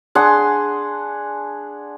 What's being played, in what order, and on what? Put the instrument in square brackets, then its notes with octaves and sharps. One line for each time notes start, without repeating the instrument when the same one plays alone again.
[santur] D4 G#4 F#5 C6